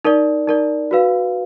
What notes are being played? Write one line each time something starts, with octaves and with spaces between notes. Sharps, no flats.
D#4 A#4 D5
D#4 A#4 D5
F#4 B4 F5